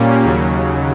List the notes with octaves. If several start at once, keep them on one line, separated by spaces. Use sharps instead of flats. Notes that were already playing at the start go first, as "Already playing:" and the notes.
Already playing: A#2 G3 A#3 C#4
D#2 C#3 F#3